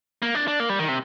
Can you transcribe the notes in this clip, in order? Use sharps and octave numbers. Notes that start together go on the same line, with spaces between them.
A#3
D4
D4
A#3
G3
D#3
C3